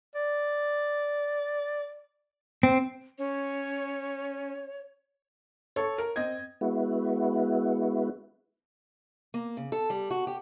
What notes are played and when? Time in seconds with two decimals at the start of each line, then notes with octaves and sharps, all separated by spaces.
0.15 D5
2.63 C4
3.18 C#4 C#5
5.76 A4 C#5
5.98 A#4
6.16 C4 D#5 G#6
6.61 G#3 B3 E4 F#4
9.34 A#3
9.57 C#3
9.72 A4
9.90 G3
10.11 F#4
10.27 G4